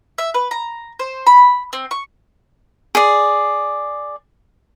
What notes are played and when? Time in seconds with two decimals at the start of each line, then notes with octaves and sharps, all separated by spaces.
0.18 E5
0.34 B4
0.51 A#5
0.99 C5
1.27 B5
1.73 C4
1.91 C#6
2.95 G#4 D5